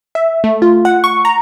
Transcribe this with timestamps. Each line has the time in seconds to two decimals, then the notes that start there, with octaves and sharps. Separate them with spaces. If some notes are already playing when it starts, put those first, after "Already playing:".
0.15 E5
0.44 A3
0.62 F4
0.85 F#5
1.04 C#6
1.25 A#5